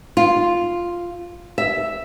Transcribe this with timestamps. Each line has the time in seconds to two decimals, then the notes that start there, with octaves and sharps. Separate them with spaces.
0.17 F4
1.58 E5